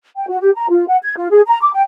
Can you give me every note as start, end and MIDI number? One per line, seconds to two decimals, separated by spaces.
0.16 0.26 79
0.29 0.38 66
0.41 0.50 67
0.56 0.68 82
0.70 0.86 65
0.87 0.97 78
1.03 1.14 92
1.17 1.28 65
1.31 1.41 68
1.47 1.59 82
1.62 1.73 86
1.73 1.82 79